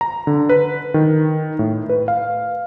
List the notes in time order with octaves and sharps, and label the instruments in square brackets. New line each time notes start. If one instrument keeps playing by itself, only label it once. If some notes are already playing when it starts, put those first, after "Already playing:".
[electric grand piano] A#5
D3
B4
D#3
A2
B4
F5